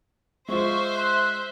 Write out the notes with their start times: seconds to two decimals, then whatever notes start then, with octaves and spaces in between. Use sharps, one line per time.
0.49 G#3 F4 C5 E5 C#6
0.95 C6 F#6